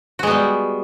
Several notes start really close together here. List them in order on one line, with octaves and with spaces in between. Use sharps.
F#4 G#3 B3 G3